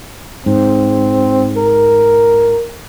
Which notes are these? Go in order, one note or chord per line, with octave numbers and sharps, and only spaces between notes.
G#2 C4
A#4